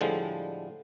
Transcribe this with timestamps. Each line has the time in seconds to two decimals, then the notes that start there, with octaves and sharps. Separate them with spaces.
0.01 A2 D3 F3 G3 G#3